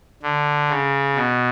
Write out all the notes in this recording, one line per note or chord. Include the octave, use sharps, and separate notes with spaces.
D3
C#3
B2